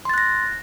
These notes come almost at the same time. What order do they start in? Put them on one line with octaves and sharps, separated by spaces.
C6 A6 F#6 A#6